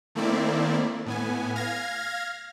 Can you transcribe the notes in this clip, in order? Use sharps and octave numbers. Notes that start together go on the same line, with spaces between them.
D#3 A3 A#3 C4 E4 D5
A2 B3 G#5
F5 F6 G#6 A#6